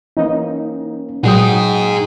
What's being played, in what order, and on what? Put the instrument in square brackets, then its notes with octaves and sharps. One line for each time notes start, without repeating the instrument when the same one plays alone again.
[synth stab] E3 D#4 [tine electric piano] A#3 C#4
[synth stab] A#2 F#3 D#6 [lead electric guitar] D#4 G#4 [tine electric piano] F#5 G5